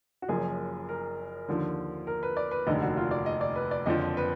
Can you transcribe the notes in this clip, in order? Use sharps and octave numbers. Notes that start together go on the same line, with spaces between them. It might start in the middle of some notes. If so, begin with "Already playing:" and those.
F#4
F#1 F#2 F3 G#4
A#4
D#2 D3 F3
A#4
B4
D5
B4
F1 D#2 D3 D#5
F#4
F4
D5
D#5
D5
B4
D5
F#1 F2 D3 F3 D#5
B4